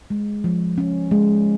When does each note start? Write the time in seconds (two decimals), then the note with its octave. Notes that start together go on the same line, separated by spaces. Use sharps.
0.10 G#3
0.44 F3
0.78 C#4
1.11 G#3